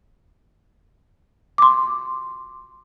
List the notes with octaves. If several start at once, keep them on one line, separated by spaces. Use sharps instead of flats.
C6 D6